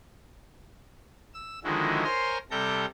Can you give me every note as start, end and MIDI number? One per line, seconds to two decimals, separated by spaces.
1.34 1.59 88
1.64 2.04 50
1.64 2.04 51
1.64 2.04 53
1.64 2.04 56
1.64 2.04 64
1.64 2.04 66
2.04 2.38 70
2.04 2.38 72
2.04 2.38 73
2.04 2.38 80
2.04 2.38 82
2.04 2.38 84
2.51 2.85 48
2.51 2.85 55
2.51 2.85 69
2.51 2.85 82
2.51 2.85 91